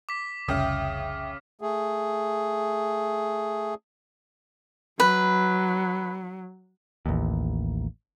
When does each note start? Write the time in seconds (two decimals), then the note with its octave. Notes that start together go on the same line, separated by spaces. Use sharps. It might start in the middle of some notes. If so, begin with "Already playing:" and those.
0.09 D6 B6
0.48 F1 C2 C#3 E5 G5 D#6
1.61 A3 G#4
5.00 F#3 B4
7.06 A1 D#2